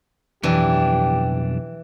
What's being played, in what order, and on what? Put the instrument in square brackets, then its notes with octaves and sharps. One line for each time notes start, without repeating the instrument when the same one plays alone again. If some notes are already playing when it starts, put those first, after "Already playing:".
[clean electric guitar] B1 F2 D4 [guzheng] E3 [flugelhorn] G4